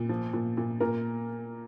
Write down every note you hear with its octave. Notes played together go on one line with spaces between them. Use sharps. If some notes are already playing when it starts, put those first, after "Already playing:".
Already playing: A#2
F3
A#2
A#2
A#2 A#4